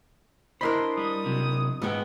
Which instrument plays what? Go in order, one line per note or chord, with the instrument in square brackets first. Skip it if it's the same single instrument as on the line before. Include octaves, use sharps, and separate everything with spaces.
[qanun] D4 E4 C6 [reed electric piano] A#4 D#5 B5 [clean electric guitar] C5
[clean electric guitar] G3 [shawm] D#6
[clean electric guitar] C3 F#3
[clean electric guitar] G#2 G#4 G5 [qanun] G#3 B3